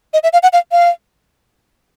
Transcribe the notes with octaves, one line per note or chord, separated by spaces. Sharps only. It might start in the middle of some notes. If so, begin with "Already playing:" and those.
D#5
E5
F5
F#5
F5
F5